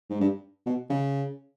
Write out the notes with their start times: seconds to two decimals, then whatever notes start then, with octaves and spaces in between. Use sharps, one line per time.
0.10 G#2
0.20 G2
0.66 B2
0.90 C#3